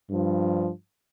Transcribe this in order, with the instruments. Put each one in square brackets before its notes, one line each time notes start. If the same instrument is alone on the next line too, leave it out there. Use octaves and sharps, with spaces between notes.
[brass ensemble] G2 F3